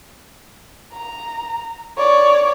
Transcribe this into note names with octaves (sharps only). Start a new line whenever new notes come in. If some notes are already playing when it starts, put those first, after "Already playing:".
A#5
C#5 D5